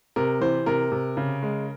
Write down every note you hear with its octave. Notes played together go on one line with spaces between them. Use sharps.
C3 A#4
E3 C5
C3 A#4
C3
C#3
G#3